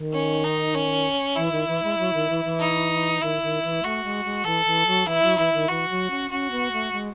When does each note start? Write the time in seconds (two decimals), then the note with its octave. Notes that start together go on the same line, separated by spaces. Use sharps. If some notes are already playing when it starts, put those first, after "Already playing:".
Already playing: D#3
0.13 C#4
0.44 D#4
0.74 C#4
1.36 E3 E4
1.52 D#3
1.67 E3
1.83 G#3
1.98 F#3
2.13 D#3
2.29 E3
2.44 E3
2.60 D#4
3.21 D#3 E4
3.42 D#3
3.63 E3
3.83 A3 F#4
4.04 G#3
4.25 G#3
4.45 E3 A4
4.66 E3
4.86 F#3
5.06 E3 E4
5.22 F#3
5.38 E3 E4
5.53 D#3
5.68 E3 F#4
5.89 F#3
6.10 C#4
6.31 C#4 F#4
6.51 B3
6.72 A3
6.92 G#3